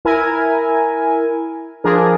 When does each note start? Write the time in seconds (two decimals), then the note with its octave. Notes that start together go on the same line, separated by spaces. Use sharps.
0.05 E4 A#4 G#5
1.84 F3 D4 G#4 A#4